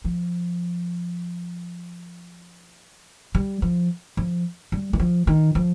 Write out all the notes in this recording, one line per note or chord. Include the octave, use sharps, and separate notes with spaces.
F3
G3
F3
F3
G3
D#3
F3
D#3
F3